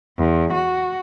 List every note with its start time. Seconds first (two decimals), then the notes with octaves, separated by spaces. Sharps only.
0.18 E2
0.53 F#4